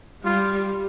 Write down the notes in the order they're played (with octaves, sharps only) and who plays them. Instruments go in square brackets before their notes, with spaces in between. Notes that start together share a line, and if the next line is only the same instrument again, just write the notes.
[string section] G3 [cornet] F4